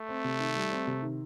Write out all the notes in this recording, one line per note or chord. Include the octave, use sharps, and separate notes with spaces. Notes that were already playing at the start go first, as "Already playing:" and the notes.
Already playing: A3
C4
C3
D#3
G3
C4
C3
D#3